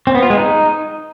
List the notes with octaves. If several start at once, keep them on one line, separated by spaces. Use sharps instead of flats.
C4
B3
F4
G#3
D#4